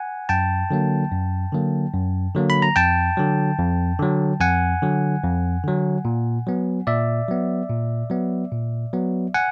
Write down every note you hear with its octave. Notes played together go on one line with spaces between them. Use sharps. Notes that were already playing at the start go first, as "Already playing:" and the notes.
Already playing: F#5 G#5
F#2 G5 A5
D3 F#3 A#3
F#2
D3 F#3 A#3
F#2
D3 F#3 A#3
B5
A#5
F2 G5 A5
D3 F#3
F2
D3 F#3
F2 F#5 G#5
D3 F#3
F2
D3 F#3
A#2
F#3 B3
A#2 D5 E5
F#3 B3
A#2
F#3 B3
A#2
F#3 B3
F#5 G#5